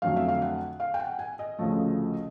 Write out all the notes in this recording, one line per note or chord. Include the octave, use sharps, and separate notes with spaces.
F2 D3 F#3 A3 F5
E5
F5
F#5
F5
G5
F#5
G#5
D#5
D2 C#3 F3 A3